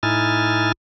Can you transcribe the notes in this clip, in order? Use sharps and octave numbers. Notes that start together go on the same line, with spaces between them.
A2 D#4 E4 G#5 F6 A6